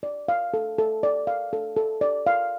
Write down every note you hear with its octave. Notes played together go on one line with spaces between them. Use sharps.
D5
F5
A4
A4
D5
F5
A4
A4
D5
F5